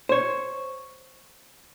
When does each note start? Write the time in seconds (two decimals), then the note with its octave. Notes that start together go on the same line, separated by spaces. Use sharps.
0.09 C5 C#5